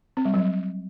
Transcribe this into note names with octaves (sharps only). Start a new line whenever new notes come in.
C4
G3
F#3